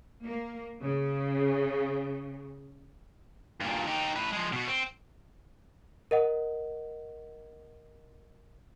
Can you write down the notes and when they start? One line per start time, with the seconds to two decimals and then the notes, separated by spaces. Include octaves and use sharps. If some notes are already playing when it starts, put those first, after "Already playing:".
0.23 A#3
0.81 C#3
3.61 G2 A#2
3.87 D#4 G4
4.16 A2 B4
4.32 F3 G#3
4.53 B2 F#4
4.68 C4
6.11 A#4 D#5 F#5